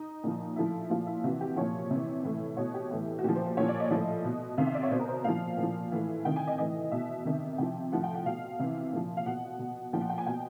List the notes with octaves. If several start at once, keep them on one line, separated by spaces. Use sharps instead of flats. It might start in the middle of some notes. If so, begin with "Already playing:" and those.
Already playing: D#4
A#2 F3
A2 F3 E4
A#2 F3 F4
E4
C3 E3 F#4
G4
A#2 F3 C#5
C3 E3
A2 E3
B2 C#5
G4
A2 E3
F#4
A#2 F3 G4
C5
C5
A#2 F3 C#5
D5
D#5
A2 F3
B2
C3 D#3 F5
E5
D5
C#5
B2 C5
A#4
C5
A#2 F3 F5
A#2
F3
A2 E3
C3 D#3 G5
G#5
D#5
A2 E3 D#5
B2 E5
C3 D#3
C3 F3 G5
A2 F3 F#5
G5
F#5
B2 F5
C3 E3
A#2 F3
F5
B2 F#5
B2
A#2 F3 G5
F#5
G5
G#5
B2 G5